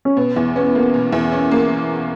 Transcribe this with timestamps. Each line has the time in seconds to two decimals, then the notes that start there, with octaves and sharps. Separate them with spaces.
0.05 C#4
0.17 B2 B3
0.36 E2
0.55 B3 C#4
0.75 A#3
0.94 B2
1.13 E2
1.32 C#4
1.52 A#3